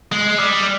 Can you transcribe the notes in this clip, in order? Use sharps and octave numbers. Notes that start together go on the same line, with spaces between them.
G#3
G3